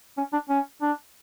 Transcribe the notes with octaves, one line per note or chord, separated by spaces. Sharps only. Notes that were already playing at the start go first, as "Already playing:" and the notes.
C#4
D4
C#4
D4